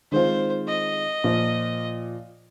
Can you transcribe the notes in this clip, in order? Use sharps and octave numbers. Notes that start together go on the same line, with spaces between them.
D#3 G#3 C4 F4 C5
D#5
A#2 F3 A#3 F4